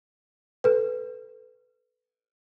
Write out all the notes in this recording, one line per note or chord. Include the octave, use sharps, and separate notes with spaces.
A4 B4